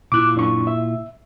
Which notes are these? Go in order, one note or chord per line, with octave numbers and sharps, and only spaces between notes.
A#2 E4 F4 D6 F#6
F#2 D4 C#6
E5